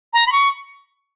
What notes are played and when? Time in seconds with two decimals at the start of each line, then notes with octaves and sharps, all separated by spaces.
0.13 A#5
0.27 B5
0.32 C#6